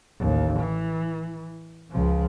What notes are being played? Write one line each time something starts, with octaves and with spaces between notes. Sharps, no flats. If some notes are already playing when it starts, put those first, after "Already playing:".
A1 D#2
E3
C#2 F3